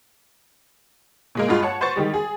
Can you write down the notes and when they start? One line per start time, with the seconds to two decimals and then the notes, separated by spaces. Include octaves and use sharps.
1.35 A#2 G#3 A#3
1.48 G2 G#3 F4 F5
1.63 C#5 F#5 A5
1.81 B4 C5 F#5 C#6 A6
1.96 D#3 G3 G#3
2.14 G#4